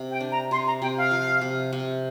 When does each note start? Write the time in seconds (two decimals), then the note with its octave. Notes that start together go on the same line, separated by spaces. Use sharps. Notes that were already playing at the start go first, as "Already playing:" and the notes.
Already playing: C3
0.11 G5
0.20 D4
0.31 A#5
0.51 C3 C6
0.66 A#5
0.82 C3 G5
0.96 F5
1.11 F3
1.41 C3
1.73 C3